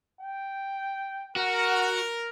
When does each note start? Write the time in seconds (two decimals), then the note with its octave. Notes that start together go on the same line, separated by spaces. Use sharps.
0.21 G5
1.36 F#4 A#4 F#5